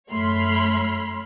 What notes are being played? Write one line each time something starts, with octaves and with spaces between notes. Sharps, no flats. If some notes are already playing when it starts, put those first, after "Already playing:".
F#2 A3 C#5 B5 C6 F6